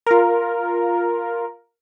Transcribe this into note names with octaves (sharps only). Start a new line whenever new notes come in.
F4 A#4